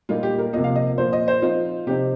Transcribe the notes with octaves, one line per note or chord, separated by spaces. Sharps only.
A#2 G3 A#3 D#4 F4
G4
A#4
C3 F3 A#3 D#5
F5
D#5
A#2 F3 A#3 C5
D#5
C5
F3 C4 D#4 F4
C3 F3 C4 D#4 G4